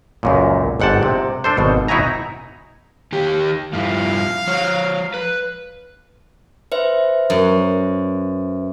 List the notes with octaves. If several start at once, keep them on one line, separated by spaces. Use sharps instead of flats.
C#2 F#2 A#2
G1 G#2 F#5 G5 A5
C3
D4 A4 C5
G#1 B2
D#4 E4 F#4 E5 G#5 A#5
D#3 G4
G2 F3 E4 F5
F3 C#5
B4
B4 C5 E5
F#2